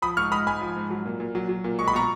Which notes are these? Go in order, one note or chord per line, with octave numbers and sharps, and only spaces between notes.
F3 B5 D#6
G#2 C#6 F6
G#3 B5 D#6
G#2 G#5 B5
F3
G#2
F#3
A#2
A#2
F#3
F#3
A#2
G#3 C#6
B5
B2 A#5 C#6